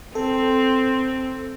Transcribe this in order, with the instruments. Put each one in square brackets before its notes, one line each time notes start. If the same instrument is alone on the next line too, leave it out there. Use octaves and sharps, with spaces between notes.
[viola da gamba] C4 [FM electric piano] A4